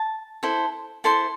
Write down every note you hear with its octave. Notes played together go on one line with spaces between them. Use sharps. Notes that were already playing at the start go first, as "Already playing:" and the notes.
Already playing: A5
E4 A4 C5
E4 A4 C5 C6